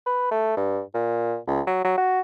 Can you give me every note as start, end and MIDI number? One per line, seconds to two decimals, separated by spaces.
0.06 0.31 71
0.31 0.54 57
0.57 0.81 43
0.94 1.38 46
1.47 1.61 37
1.67 1.80 54
1.84 1.94 54
1.98 2.21 66